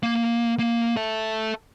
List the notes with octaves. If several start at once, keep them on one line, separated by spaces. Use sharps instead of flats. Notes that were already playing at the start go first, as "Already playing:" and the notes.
A#3
A#3
A4 E5